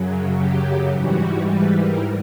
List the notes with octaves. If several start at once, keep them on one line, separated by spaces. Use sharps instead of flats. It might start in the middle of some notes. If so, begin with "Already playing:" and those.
Already playing: F#2 C#3 F#3
G4
G#2 E3 G3 F#4
B4
A#4